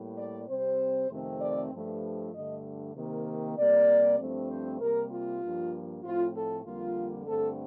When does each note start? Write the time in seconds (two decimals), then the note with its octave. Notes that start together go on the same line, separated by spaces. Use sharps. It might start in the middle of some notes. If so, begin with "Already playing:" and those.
Already playing: A2 G3 A#3
0.17 D5
0.48 C3 G3 C4 C5
1.10 F2 C3 D#3 A3 C4
1.41 D5
1.72 G2 F3 A3
2.33 G2 D3 A3 D#5
2.95 C3 D#3 A#3
3.57 C3 G3 A#3 D5
4.18 G2 F3 A3 C4
4.49 C5
4.80 C3 G3 A#3 A#4
5.11 F4
5.42 G2 F3 A#3
6.03 A2 F3 A3 C4 F4
6.34 A4
6.65 F2 D3 G3 A#3 F4
7.26 G2 D3 A3 C4 A4